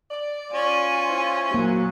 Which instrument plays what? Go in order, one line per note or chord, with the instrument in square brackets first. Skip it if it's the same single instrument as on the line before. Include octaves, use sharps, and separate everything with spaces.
[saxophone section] D5
[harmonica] C#4 [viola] F4 G#5
[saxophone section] E4 C5
[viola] F#3 [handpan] A#3